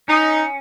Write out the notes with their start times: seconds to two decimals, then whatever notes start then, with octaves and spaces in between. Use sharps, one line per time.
0.08 C#4 D#4